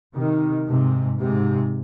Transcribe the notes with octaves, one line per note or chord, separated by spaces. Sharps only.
C3 D#3
G#2 C3
G#2 C3